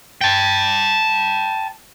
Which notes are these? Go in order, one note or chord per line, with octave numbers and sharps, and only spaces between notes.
G5 A5